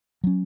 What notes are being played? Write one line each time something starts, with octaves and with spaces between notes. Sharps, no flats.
F#3 C#4